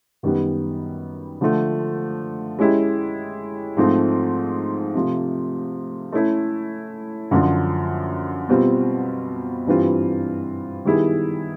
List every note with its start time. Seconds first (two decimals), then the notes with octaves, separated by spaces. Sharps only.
0.23 F#2 D#3 G3 B3
1.41 D3 F3 A3
2.59 G#3 C#4 E4 G4
3.77 G#2 F3 A3 C4
4.94 C3 F3 A3
6.12 A3 C#4 E4 A4
7.31 F#2 D3 F3
8.49 B2 G3 C4 F4
9.67 G2 E3 G3 C4 F4
10.85 D#3 G3 B3 E4 G#4